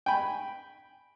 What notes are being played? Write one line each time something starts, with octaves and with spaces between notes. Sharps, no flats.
G5 G#5 B5